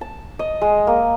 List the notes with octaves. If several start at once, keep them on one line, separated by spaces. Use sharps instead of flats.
A5
D#5
G#3
A#3